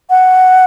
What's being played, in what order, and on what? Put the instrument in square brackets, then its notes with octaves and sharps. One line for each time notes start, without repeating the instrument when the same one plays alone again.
[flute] F#5